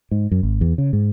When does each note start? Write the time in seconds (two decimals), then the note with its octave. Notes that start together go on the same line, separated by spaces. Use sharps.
0.11 G#2
0.31 F#2
0.43 G#1
0.61 E2
0.78 C#3
0.93 G#2